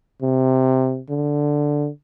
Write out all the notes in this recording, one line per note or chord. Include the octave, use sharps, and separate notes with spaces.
C3
D3